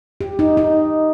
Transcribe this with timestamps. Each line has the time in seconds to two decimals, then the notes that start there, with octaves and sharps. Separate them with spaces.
0.21 G4
0.39 D#4
0.57 D#4